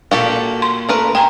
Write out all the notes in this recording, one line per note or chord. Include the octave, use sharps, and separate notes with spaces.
A#2 A#3 F#4 G4 A4
C6
A3 A#4 B4
G#4 G5 A#5